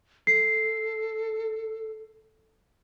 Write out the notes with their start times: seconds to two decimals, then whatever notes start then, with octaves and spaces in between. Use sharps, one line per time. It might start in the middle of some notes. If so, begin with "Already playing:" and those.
0.27 A4 C7